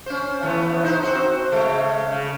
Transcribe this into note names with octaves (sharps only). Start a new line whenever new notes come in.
C#4 C5
E3 A3 B3
D#4 C5
C4 F#4 C5
C#3 G#3 A3
C#3